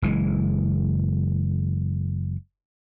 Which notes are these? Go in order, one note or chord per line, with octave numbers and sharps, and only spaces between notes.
F#1 E3 G#3